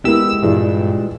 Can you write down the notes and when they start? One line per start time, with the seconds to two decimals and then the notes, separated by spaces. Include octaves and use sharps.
0.05 G#3 B3 E4 G4 A#4 E6
0.43 G2 A#2 E3 G#4